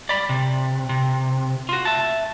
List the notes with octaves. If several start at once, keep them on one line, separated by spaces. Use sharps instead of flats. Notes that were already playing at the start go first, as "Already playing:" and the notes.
D5 B5
C3
C3
F4 F#4
E5 A5